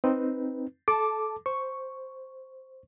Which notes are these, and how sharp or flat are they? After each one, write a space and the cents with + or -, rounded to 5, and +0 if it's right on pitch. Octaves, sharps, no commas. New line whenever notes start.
C4 +0 D#4 +0 B4 +0
A4 -20 A5 +0 D6 +0
C5 +0 C#6 +0